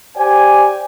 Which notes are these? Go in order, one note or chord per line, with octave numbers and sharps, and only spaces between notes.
G4 C5 D5 G#5